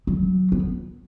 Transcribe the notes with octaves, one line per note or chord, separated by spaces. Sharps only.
F#3
B3